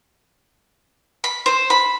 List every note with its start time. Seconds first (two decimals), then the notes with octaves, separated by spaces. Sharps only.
1.24 B5
1.46 C5
1.70 B5